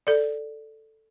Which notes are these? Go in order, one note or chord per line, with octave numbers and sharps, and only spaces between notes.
A4 D5